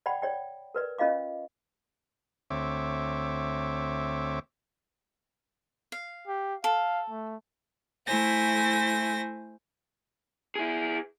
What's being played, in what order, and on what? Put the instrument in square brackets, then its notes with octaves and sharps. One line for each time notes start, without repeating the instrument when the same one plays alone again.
[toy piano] D5 F#5 G5 B5
C#5 D5 G5
A#4 B4 D5
C#4 F4 D#5 F5 D6
[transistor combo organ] D2 C4 C#5 E5 D6
[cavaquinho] F5
[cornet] G4
[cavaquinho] A4 [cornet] F5
[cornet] A3
[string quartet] A3 E4 C5 G#5 A#6
[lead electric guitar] E4 G#4